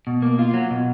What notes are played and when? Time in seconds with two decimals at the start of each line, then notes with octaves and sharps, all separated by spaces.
0.07 B2
0.22 A#3
0.39 F4
0.54 F#3
0.71 B2